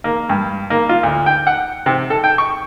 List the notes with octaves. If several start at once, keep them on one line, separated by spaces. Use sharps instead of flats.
A#3
G2
A#3
F4
D2
G5
F#5
C3
A4
G5
C#6